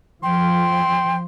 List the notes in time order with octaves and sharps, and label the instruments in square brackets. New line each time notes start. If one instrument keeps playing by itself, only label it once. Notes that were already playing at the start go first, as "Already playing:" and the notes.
[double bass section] F3 [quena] G5 [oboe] C6